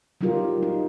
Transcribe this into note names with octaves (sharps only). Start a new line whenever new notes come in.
F#3 G3 D#4 F4 G4 A#4
D#4